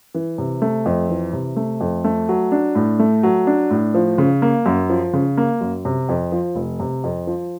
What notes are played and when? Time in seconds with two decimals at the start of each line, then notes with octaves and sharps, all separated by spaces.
0.15 E3
0.38 C3
0.62 A3
0.86 F2
1.09 E3
1.33 C3
1.56 A3
1.81 F2
2.04 A3
2.29 F#3
2.52 D4
2.75 A2
2.99 A3
3.23 F#3
3.47 D4
3.70 A2
3.94 F3
4.18 C#3
4.42 A#3
4.66 F#2
4.90 F3
5.14 C#3
5.37 A#3
5.61 F#2
5.85 C3
6.09 F2
6.32 F3
6.55 F1
6.80 C3
7.04 F2
7.27 F3